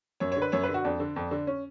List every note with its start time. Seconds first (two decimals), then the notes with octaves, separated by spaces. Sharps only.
0.20 F#2 C#5
0.32 C#5
0.37 D3
0.42 B4
0.52 F#2 C#5
0.63 B4
0.69 D3
0.74 F#4
0.84 F2 D4
1.00 D3
1.16 F2
1.31 D3
1.47 C#4